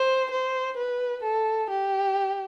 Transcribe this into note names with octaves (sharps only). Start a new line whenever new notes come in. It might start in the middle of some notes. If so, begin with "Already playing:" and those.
Already playing: C5
C5
B4
A4
G4